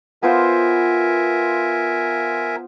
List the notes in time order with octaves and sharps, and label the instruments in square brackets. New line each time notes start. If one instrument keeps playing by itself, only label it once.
[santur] B3 F4 C5 [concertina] A#4 E5 G#5